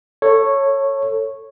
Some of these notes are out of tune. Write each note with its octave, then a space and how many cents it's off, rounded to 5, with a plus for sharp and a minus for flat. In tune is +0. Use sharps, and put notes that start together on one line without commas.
A4 +20 C#5 -10